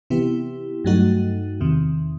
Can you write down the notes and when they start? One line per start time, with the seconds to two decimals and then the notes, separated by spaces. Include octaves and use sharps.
0.10 C3 E3 B3 E4 G4
0.84 G2 F#3 A3 D#4 F#4
1.61 E2 C3 D#3